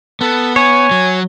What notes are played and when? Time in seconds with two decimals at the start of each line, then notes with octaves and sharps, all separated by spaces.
0.21 B3 A4
0.56 C#5 G#5
0.91 F#3